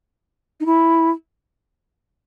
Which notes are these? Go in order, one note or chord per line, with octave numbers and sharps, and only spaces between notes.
D#4
E4